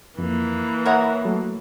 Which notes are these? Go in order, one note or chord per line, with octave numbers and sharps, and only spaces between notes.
F2 E3 A#3
A#4 C#5 E5 F#5 A#5 D#6
F#3 A3